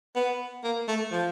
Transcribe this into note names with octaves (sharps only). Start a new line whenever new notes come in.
B3
A#3
A3
F3